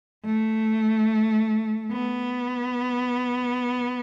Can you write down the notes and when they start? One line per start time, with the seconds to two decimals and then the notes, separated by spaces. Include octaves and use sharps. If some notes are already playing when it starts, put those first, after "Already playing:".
0.25 A3
1.92 B3